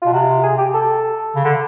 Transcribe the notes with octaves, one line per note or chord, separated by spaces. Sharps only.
B2 F4
C3 F#4
G#4
G4
A4
C#3
D3